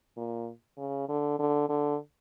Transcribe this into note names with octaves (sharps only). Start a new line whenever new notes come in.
A#2
C#3
D3
D3
D3